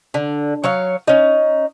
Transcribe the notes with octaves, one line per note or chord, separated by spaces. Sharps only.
D3
F#3 C#5 F5
C#4 D#4